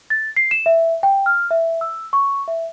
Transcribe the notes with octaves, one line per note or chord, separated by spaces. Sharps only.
A6
C7
E7
E5
G5
F6
E5
E6
C#6
E5